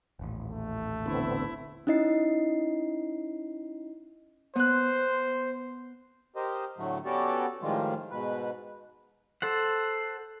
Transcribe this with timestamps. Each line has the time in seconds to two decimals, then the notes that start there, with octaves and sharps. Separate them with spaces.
0.19 D#1 A1
0.50 A3
1.06 D3 B3 C4 E4
1.87 C#4 D#4 E4 D#5 C7
4.56 B3 C5 F#6
6.36 G4 A#4 C5 D#5
6.78 A2 D3 F#3 A3
7.05 B3 C#4 F#4 G4 A4 D5
7.62 A2 D#3 F3 G3 G#3 F4
8.11 G#2 B2 B4
9.42 A4 C5 F#5